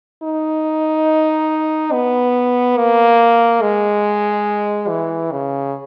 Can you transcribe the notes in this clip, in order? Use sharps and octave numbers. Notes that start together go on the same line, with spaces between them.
D#4
B3
A#3
G#3
E3
C#3